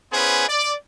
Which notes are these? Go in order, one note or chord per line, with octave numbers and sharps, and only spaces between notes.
B3 C#4 E4 G#4 B4 C5
D5